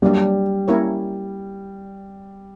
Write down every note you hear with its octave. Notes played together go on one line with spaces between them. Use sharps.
F#3 G3 A#3 D4
A#3 C#4 E4 A#4 C#5